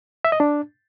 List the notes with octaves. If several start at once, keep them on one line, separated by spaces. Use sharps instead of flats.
E5
D#5
D4